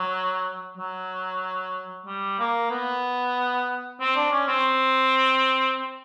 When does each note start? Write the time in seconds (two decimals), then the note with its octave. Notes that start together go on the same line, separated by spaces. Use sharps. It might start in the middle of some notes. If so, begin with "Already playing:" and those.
Already playing: F#3
0.77 F#3
2.06 G3
2.39 A#3
2.70 B3
4.00 C4
4.16 D4
4.32 C#4
4.48 C4